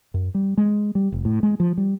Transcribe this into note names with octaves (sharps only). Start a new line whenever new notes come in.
F#2
G3
G#3
G3
F1
A2
G#3
F3
G3